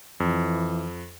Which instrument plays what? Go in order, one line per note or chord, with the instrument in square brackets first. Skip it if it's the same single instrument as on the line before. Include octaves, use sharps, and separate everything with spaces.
[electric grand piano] F2 [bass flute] E3